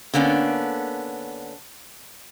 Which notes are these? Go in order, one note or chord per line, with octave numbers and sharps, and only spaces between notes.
D3 A#3 B3 C#4 D4